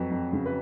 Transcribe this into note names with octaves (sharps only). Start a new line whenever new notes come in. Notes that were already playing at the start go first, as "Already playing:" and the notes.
Already playing: F2 F#3 B4
F2
C#3
B4